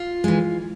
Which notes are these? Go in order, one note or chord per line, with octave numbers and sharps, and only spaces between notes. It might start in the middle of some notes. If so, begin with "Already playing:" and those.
Already playing: F4
E3 G#3